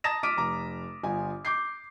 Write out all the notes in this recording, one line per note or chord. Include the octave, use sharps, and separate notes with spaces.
A5 A#5 D#6 A6 A#6 E7
D6 F6 B6 D7 D#7
F1 A#5 D6
G1 F4 G#5
D6 G6 C7